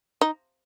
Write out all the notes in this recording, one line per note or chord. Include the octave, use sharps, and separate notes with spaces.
D#4